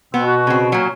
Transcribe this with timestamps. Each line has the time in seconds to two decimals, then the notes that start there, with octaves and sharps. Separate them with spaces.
0.14 B2 B3 C4
0.26 F#4
0.47 C#3 C4
0.72 A#2 F#3 C#4